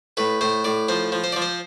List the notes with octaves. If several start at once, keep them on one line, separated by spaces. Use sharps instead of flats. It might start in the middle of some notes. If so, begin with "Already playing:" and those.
A2 B4
A2 C5
A2 D5
F3 C5
F3
C5
D5
F3
C5